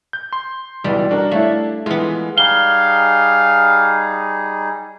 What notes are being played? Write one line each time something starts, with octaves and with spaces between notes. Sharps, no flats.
G6
C6
C#2 B2 E3 G3
D4 F#4 A#4 D5
A3 E4 C#5 F5
E3 G#3 B3 F4
G3 D#4 G#4 F5 G7